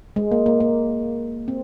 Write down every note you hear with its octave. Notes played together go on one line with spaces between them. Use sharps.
G#3
A#3
A#3
A#3
C4